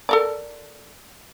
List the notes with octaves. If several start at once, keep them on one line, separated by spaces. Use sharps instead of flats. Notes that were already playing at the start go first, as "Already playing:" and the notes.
A4 A#4 D5